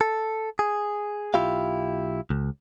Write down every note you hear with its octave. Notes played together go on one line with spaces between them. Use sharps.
A4
G#4
B1 E4 F4 G4 F5
C#2